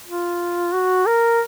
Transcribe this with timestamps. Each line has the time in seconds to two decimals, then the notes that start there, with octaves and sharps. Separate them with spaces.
0.08 F4
0.74 F#4
1.06 A#4